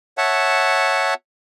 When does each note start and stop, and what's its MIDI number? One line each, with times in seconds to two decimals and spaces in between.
0.18 1.14 73
0.18 1.14 76
0.18 1.14 78
0.18 1.14 81